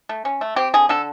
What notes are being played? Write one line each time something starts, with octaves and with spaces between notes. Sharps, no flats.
A3
C#4
A3
C4 G4
D3 G#4
D3 A4